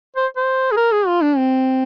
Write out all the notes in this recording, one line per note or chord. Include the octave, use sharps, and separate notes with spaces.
C5
C5
G#4
A#4
G#4
F4
D4
C4